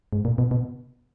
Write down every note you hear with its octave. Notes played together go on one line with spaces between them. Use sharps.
G#2
A#2
B2
B2